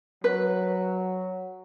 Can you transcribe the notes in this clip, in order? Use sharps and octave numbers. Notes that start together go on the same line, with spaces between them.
F#3 B4